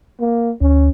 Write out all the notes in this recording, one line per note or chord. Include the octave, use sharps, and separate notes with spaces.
A#3
D2 C#4